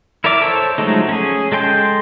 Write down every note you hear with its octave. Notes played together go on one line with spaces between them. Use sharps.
E4 A#4 D5 E5 D6
A4 C5 C#5 A5 E6
F3 F#3 G#3 A3 D#4
C#4 G#4
G#3 A4 G5 C6 G6